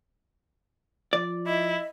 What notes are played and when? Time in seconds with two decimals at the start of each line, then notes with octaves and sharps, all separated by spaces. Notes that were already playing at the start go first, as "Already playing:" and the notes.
1.13 F3 D5
1.47 E4 D#5